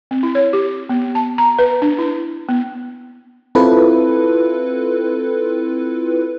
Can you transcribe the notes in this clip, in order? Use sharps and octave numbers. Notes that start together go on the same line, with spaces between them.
C4
E4
C#5
G4
B3
A5
A#5
B4
D4
E4
B3
C4 E4 F4 A4 B4